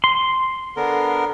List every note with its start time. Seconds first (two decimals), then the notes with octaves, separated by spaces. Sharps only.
0.04 C6
0.76 D3 B3 A#4